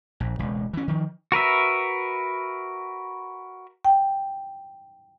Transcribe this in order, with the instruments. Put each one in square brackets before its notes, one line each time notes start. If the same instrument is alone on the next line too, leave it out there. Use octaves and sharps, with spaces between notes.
[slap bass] A#1
E1 C#2
E3 C#4
D#3 F3
[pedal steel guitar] F#4 A#4 B4 E5
[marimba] G5